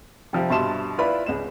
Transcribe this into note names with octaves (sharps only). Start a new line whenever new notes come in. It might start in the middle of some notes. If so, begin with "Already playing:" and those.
C3 F3 G3
G2 B2 E5 A5 C6 E7
E4 F4 B4 D5 F5 B5
C#2 E7